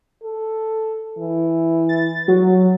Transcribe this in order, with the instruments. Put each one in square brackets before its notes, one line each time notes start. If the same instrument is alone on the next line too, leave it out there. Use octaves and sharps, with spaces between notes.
[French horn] A4
E3
[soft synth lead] A6
F#3